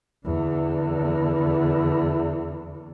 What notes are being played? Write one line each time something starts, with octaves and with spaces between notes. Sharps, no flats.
E2 D3